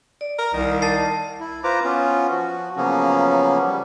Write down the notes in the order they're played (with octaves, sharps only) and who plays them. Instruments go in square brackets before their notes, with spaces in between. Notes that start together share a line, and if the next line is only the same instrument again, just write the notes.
[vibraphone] D5
[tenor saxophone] A#4
[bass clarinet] C2 [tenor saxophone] D#3
[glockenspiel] A5 A6 C7
[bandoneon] E4
F4 B4 C5 A#5 D6
B3 C#4 F4
F3 F#4
C#3 F3 F#3 A#3 B3 C#4
G3